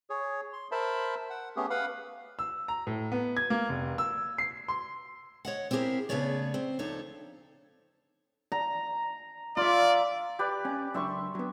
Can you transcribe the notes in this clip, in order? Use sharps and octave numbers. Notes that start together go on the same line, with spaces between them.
G#4 C#5
C6
A#4 C5 E5 A5 B5
F#5
A3 B3 C#4 G4 G#4
B4 F5 F#5 B5
E6
A#5
A2
B3
G#6
A#3
F1
E6
C7
C6
C#5 D#5 F#5
C4 E4 G4 G#4 A#4
C#3 A3 B3 G#4 C#5 D5
C4
D2 F3 D#4 A4 C#5
A#5
F4 D5 E5
G4 B4 D5
C#4
C#2 F#2 D4 E5 C6 C#6
F#3 B3